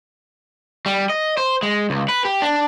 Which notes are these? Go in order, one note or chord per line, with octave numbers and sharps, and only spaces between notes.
G3
D#5
C5
G#3
C#2
B4
G4
D4